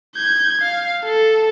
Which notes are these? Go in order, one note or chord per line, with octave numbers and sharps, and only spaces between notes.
G6 G#6
F5
A4